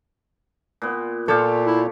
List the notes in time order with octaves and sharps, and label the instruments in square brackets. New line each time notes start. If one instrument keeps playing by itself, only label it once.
[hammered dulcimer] A#2 B3
[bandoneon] A#2 [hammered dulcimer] F4 G4 C#5 [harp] A4
[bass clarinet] E4